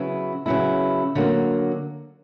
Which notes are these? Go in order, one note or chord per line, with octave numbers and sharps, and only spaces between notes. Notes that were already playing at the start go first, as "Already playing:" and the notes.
Already playing: C#3 F#3 B3 E4
C#3 F#3 B3 E4
D3 F#3 A#3